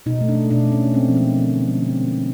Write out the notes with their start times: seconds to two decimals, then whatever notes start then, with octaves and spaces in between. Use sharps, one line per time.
0.06 B2 D#4
0.21 A3
0.29 D4
0.35 A3
0.50 B2 D4
0.65 A3
0.72 C#4
0.80 A3
0.94 G#3 C4
1.08 F3
1.17 A#3
1.24 F3
1.39 D3
1.54 D3
1.61 B3
1.68 G#3
1.82 D3 C4
1.98 G3
2.05 C#4
2.12 G3